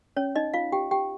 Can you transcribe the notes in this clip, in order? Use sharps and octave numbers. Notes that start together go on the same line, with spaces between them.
C#4 C#5
D#4 D#5
F4 F5
G4 G5
G4 G5